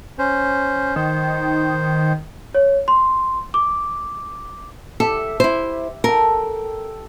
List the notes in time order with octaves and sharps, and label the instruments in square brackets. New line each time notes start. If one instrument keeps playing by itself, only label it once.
[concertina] C#4 C5
[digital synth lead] D#3 [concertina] C5
[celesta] C#5
C6
D6
[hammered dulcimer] G4 E5 [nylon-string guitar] A4
[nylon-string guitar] E4 C5
[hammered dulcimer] A4 G5 [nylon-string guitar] A#4